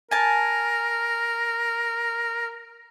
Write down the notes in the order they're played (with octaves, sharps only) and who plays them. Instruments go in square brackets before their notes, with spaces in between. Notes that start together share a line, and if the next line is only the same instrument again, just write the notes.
[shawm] A#4 [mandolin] G#5 A5